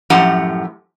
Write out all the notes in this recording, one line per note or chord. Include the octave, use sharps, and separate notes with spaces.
F#2 A2 F3 G4 F#5 A#5